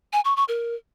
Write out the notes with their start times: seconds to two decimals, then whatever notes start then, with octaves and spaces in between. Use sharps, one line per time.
0.13 G#5
0.25 C#6
0.37 C#6
0.48 A#4